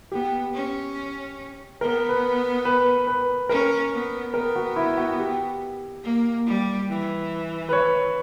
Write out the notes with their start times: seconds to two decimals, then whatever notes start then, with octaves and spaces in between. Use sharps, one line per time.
0.12 B3 G4
0.54 C#4
1.81 B3 A#4
2.09 B4
2.65 B4
3.07 B4
3.49 C#4 A#4
3.92 B3
4.34 B3 A#4
4.56 F#4
4.76 E4
4.98 F#4
5.18 G4
6.03 A#3
6.46 G3
6.88 E3
7.69 B4
7.73 C#5